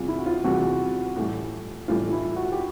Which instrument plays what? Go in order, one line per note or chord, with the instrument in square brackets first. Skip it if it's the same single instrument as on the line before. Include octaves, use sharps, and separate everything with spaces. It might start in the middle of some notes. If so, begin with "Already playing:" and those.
Already playing: [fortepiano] E2 C3 E3 G3 [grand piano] F4
[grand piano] E4
F#4
F4
[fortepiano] E2 C3 E3 G3 [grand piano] F#4
[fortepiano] A2 E3 G3
[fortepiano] A2 E3 G3 [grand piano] F4
[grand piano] E4
F#4
G4